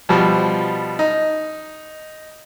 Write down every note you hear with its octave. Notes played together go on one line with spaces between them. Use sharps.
B2 F3 G3
D#4